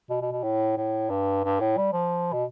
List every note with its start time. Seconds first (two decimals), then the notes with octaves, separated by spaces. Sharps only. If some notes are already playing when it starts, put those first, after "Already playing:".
0.10 B2
0.22 B2
0.32 B2
0.43 A2
0.77 A2
1.10 G2
1.44 G2
1.60 A2
1.77 G3
1.93 F3
2.33 B2